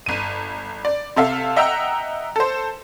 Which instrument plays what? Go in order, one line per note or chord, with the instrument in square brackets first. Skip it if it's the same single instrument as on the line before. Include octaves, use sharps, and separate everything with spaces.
[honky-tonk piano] G1 D#7
D5
C3 A4 E5 F5
D#5 E5 F#5 G5 A#5 E6
A4 C5